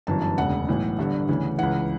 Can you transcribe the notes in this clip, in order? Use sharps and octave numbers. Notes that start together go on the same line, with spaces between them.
G1 F#2 E3 A5
A5
E1 D2 C#3 F#5
B1 A2 E3
G1 G2 D3
D2 C#3 E3
C#2 C#3 E3 F#5